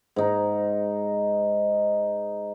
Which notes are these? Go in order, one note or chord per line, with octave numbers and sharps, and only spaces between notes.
G#2 D#4